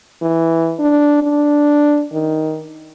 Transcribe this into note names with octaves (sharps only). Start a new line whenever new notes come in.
E3
D4
D4
D#3